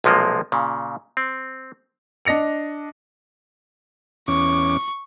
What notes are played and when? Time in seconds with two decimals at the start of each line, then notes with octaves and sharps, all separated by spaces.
0.04 B1 C3 F3 G#3 A#3
0.52 A#2 C#3
1.17 C4
2.25 D4 D#5 A#6 C#7 F7
4.28 E2 C#4 C#6 D6